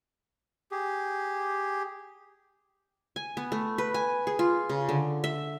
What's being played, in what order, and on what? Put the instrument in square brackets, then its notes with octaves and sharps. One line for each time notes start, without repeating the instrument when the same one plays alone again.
[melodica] G4 G#4
[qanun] G#5
B3
A3
B4
G#5
G#4
F4
C#3
D3
E5